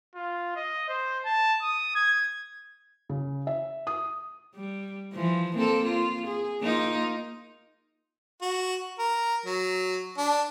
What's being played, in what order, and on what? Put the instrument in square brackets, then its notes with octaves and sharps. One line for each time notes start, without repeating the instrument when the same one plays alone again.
[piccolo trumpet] F4
D#5
C5
A5
D#6
G#6
[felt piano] C#3
E5
D#6
[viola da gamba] G3
E3 F3
A#3 C4 A4
F4
G#4
A#3 D#4 F4
[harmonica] F#4
A#4
F#3
D4